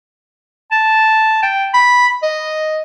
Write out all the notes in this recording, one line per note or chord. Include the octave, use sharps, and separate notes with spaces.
A5
G5
B5
D#5